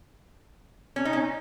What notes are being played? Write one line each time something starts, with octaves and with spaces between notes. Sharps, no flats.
C#4
D#4
C#4